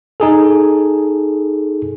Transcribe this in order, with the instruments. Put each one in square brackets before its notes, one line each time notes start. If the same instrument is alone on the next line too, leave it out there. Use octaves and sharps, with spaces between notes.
[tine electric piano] D#4 G#4 A4